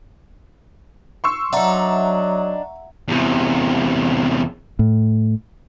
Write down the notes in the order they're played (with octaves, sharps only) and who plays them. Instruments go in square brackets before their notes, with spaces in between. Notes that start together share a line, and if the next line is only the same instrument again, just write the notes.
[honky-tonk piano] C6 C#6 E6
[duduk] F#3 [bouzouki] D4 D#4 [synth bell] E5 F#5 A#5
[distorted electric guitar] E2 C3
[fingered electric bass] A2